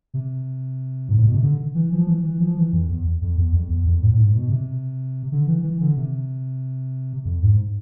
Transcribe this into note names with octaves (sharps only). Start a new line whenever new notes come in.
C3
G#2
A2
B2
C3
D3
E3
F3
E3
E3
F3
E3
F2
E2
F2
E2
F2
E2
F2
A2
A2
G#2
B2
C3
D3
E3
E3
D3
C3
F2
G#2